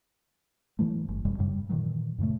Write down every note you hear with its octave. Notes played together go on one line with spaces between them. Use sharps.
A2 E3 F#3 A3
G1
E1 F2 B2 G3
F#2 A2 C#3 G3
A#2 D#3 E3 F#3
F#2 A#2 C#3 A3